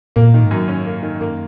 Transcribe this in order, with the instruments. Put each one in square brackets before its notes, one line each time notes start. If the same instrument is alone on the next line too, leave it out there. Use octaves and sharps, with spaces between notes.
[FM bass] A#2 [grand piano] A#3
[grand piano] D#3
[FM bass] G#2
[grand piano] F#2
C#4
A#3
D#3
[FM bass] F#2 [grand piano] A#3